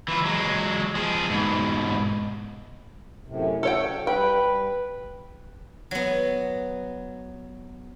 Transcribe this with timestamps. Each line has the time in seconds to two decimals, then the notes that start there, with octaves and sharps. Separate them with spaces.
0.08 E3 F4
0.25 F#3 G#3
0.95 F3 G#4
1.30 G#2 B2
3.26 F#2 A2 C3
3.63 F#4 A4 C#5 G5
4.07 G3 B4 G5
4.41 G2
5.91 F#3 B3